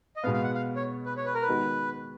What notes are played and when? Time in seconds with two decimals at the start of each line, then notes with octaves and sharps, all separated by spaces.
0.16 D#5
0.23 B2 G#3 B3 F5
0.34 F5
0.43 F#5
0.55 F5
0.76 C#5
1.06 B4
1.17 C#5
1.25 B4
1.34 A#4
1.42 B4
1.48 D#3 G#3 B3 F#4